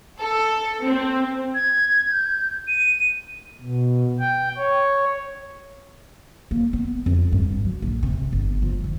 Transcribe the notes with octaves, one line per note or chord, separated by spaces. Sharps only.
A4
C4
G#6
G6
D#7
B2
G5
C#5
A#3
B3
F2
G2
F#3
A#1
C3
G1
F3
D#3